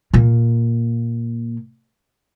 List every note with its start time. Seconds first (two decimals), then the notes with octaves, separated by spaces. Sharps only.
0.13 A#2 A#3